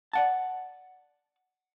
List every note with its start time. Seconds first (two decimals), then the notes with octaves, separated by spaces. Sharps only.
0.13 D5 F#5 A5